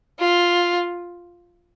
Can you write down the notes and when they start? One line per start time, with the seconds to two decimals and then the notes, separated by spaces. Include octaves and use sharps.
0.20 F4